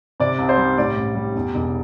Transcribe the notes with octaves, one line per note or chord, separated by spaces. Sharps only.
C3 D5
C2
C5
G3
A2 D5
A1
G3
E2
E1